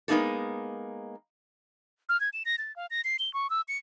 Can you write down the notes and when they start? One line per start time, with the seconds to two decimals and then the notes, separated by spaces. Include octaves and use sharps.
0.08 G#3 A#3 B3 D#4 G#4 A4
2.09 F6
2.21 G#6
2.33 E7
2.45 A#6
2.58 A6
2.76 F5
2.90 A#6
3.04 C7
3.19 G7
3.34 C#6
3.50 E6
3.68 C#7